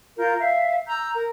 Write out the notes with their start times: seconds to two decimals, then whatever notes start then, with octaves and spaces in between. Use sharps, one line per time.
0.17 F4 A#4 G6
0.38 E5 F5
0.87 A#5 E6 G6
1.14 A#4